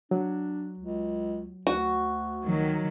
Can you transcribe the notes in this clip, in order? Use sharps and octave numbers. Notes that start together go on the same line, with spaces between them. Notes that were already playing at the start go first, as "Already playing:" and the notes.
F#3 D4
C#2
D2 F#4
D#3 F#3